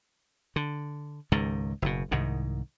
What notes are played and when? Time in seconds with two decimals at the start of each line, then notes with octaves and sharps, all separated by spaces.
0.56 D3
1.32 C#2 G#2 D#3
1.82 F#1 B2
2.11 C2 G#2 D#3